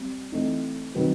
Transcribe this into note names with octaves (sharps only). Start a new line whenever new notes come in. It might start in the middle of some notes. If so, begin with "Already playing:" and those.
Already playing: G3 C4
E3 A3 C4 D#4
D#3 F#3 C4 F#4 B4